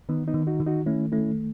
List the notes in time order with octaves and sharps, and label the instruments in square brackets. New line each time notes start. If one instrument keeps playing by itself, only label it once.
[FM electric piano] D#3 [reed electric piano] B3 D#4
[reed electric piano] B3 D#4
[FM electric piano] D#3
[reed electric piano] D#4 F#4
[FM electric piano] D#3
[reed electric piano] D#4 F#4
[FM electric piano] A3 [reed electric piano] C#4 E4
[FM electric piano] A3 [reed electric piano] C#4 E4